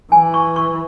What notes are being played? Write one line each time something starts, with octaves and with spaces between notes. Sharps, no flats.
E3 G#5
C#6
C#6